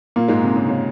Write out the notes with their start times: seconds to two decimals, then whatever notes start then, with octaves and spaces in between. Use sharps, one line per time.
0.16 A#2 A#3
0.28 G#2 G#3
0.42 C3
0.56 C#3
0.68 C#3